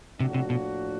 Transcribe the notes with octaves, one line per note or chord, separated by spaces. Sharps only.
A2 C3 F3 A#3 D4 F#4
C3
B2